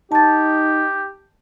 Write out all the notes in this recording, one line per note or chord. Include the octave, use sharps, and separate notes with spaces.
D#4 G4 A5 A6